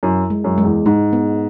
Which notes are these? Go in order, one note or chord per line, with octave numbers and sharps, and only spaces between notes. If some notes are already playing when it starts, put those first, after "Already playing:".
F#2 E4
G#3
F#2
G#3
E2
G#2 G#3
B3